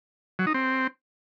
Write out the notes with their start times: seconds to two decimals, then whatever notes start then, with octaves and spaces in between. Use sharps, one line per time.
0.39 F#3
0.47 D#4
0.54 C4